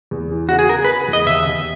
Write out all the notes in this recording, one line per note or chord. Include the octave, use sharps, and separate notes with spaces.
E2
E3
C#3 F#4
G#4
C#3 A#4
B4
C#3
E2
D#5
D#2 E5
D#2